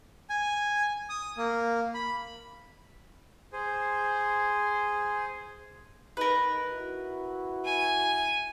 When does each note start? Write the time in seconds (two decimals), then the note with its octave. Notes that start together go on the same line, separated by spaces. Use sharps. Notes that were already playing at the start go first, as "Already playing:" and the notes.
0.30 G#5
1.09 D#6
1.38 A#3
1.94 B5
3.53 G#4 C5
6.17 D#4 A#4 B4
6.72 E4 F#4
7.65 G#5